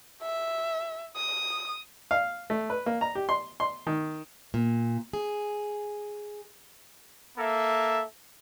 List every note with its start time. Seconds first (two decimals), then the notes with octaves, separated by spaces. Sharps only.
0.22 E5
1.17 D#6
2.11 F5
2.50 A3
2.70 B4
2.86 A#3
3.01 A#5
3.15 G4
3.29 C6
3.60 C6
3.87 D#3
4.54 A#2
5.13 G#4
7.38 A#3 A4 E5